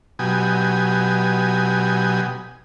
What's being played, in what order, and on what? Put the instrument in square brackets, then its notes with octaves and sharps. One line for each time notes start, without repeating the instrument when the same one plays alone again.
[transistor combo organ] B2 F#3 G4 G#5 D#6